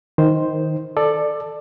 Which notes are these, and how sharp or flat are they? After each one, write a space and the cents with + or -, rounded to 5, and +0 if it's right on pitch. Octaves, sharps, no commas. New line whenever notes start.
D#3 +10 D#4 +45 C5 +0
A4 +0 D5 +20